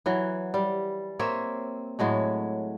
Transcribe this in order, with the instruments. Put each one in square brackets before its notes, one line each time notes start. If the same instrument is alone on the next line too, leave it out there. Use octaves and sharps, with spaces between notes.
[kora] E3 F#3
G3
A#3 C4 C#5 E5
A2 F#3 G#3 A3